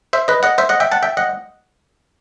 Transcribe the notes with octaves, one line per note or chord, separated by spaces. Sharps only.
C5 E5
B4 D#5
D#5 F#5
C5 E5
D#5 F#5
E5 G5
F#5 A5
E5 G5
D#5 F#5